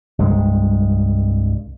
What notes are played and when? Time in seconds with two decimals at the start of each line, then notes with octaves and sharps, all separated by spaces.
0.19 C2 G2 G#3